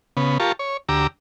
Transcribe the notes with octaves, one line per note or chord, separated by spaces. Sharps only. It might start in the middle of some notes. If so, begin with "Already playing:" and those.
C#3 B3
F4 G4 A#4 A5 C#6
C#5
D2 G4 A#5 D6 E6